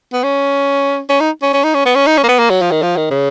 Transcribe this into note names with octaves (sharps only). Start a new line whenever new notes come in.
B3
C#4
C#4
D#4
C#4
C#4
D#4
C#4
B3
C#4
D#4
C#4
A#3
B3
A#3
F#3
F3
D#3
F3
D#3
C#3